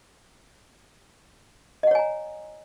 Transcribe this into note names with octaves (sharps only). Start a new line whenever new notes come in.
C#5 D#5 F#5 G#5 A#5